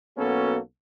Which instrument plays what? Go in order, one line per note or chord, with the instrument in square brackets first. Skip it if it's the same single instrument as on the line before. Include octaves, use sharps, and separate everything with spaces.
[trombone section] B1 A#3 B3 C#4 F#4 A4